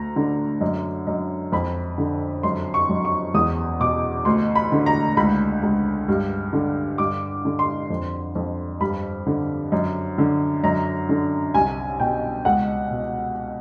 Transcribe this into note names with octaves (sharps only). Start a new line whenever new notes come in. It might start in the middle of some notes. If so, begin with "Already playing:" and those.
Already playing: D2 A#5
D3
F#2
F#2
F2 B5
D3
F#2 C6
C#6
F#2
C#6
E2 D#6
B2 D6
D2 C6
B5
D3
A#5
C#2 B5
C#2
G2
D3
G2 D6
D3
C6
F2
F2
G2 B5
D3
F#2
D3
F#2 A#5
D3
C2 G#5
B2 G5
C#2 F#5
B2